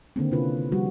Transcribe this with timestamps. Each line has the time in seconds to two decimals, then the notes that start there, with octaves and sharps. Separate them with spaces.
0.16 D3 D#3 A#3 C4
0.32 C3 C#4 E4 F4 B4
0.72 F3 G3 F#4